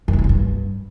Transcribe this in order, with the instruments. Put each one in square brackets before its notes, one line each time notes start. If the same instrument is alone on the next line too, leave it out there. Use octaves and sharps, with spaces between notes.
[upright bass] F#2
A#2
A2
B2
G2